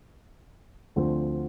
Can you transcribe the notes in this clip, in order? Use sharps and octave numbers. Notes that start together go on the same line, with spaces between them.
D2 D3 F3 C4